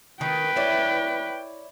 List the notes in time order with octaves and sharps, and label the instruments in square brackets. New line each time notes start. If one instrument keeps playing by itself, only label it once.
[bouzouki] D#3 D#4 [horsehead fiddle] B4 G5
[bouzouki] E4 C#5 D5